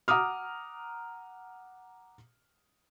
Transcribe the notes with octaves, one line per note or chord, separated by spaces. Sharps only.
F#5 A#5 D6 D#6 F6